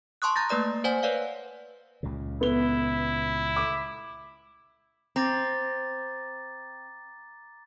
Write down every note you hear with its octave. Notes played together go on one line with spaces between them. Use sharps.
A5 C6 C#6 D#6 F#6
A#5 G6 A6 A#6
A3 A#3 B4 D5 D#6
C5 D5 F#5 G#5
B4 C#5 D5 F5 F#5
C#2 A#2 C#3
B3 E4 G7
D6
C4 A#5 D6 A6